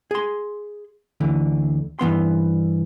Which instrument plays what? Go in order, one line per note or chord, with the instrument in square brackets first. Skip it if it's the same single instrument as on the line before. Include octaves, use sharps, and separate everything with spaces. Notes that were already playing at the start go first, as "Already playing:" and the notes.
[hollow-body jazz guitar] G#4 C6
D2 D3 E3
G2 E3 B3 C6